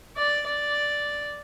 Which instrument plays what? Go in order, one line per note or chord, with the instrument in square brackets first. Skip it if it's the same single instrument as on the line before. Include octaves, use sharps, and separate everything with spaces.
[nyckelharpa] D5
D5